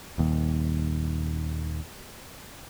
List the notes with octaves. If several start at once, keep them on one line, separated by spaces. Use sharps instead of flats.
D#1 D#2